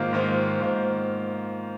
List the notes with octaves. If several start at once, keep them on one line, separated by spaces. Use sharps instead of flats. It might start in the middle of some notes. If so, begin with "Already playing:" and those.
Already playing: G#2 D#3 A#3 F4 C5
G#2 D#3 A#3 F4 C5
G#2 D#3 A#3 F4 C5